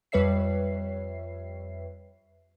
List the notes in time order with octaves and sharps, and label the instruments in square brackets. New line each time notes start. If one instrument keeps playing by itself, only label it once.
[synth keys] F2 G3 B4 C#5 E5 C7